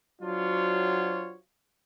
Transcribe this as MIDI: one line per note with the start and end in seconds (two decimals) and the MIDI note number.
0.22 1.35 54
0.22 1.35 62
0.22 1.35 65
0.22 1.35 66
0.22 1.35 72
0.22 1.35 73